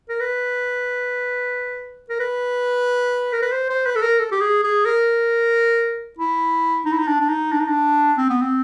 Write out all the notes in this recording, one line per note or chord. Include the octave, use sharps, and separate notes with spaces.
A#4
B4
A#4
B4
A#4
B4
C5
C5
B4
A4
A#4
A4
G4
G#4
G#4
A#4
E4
D#4
E4
D#4
D4
D4
D#4
D4
D#4
D4
C4
B3
C4